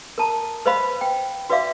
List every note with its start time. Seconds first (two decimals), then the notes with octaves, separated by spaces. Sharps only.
0.18 A#4 A5 A#5
0.66 B4 C5 D#5 F5 B5
1.01 G5
1.50 F#4 B4 D5 E5 F5 D6